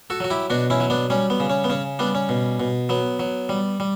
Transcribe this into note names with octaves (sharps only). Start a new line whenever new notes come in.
F#4 A4
F#3 F#4
E4 G4
B2 D4 F#4
C#4 E4
F#3
B3 D4
G3 C#4
B3
C#3
C#4
B3
C#3 C#4
G3 B3 D4
C#4
B2
B2
F#3 B3
F#3
G3
G3